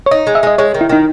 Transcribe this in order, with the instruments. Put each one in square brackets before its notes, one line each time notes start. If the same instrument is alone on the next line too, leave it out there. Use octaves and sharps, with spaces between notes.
[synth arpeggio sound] C#5
[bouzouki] D#4 [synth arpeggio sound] D#5
[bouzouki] G#3
[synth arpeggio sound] E5
[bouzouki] G#3 [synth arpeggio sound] D#5
[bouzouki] G#3 [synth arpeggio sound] C#5
[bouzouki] D#3
[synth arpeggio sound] E4
[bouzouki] D#3 [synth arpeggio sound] D#4